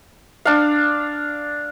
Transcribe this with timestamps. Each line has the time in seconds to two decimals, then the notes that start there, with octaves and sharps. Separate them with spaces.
0.45 D4 F5